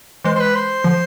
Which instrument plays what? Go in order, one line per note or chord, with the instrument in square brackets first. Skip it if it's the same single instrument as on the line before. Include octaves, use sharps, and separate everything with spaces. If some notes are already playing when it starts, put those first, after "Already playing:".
[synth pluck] E3 G#3 [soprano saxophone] C5
[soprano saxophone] C5
B4
C5
[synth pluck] D3 F3